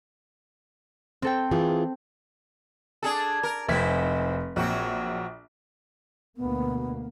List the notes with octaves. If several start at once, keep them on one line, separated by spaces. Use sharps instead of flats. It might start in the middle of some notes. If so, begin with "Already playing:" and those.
C4 A4 G5
E3 F4 G#4
D4 G#4 A4
A#4
F1 G#2 C4 E4 B6
A#1 F#3 C4 F#4
D2 B2 A#3 B3